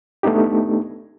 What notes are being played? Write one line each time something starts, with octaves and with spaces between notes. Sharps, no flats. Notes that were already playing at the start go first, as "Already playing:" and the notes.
A3 B3 D4 D#4 G4